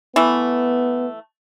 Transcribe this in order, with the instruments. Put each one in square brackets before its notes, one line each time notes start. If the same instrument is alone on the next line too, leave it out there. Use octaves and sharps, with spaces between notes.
[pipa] E3 A3 [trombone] B3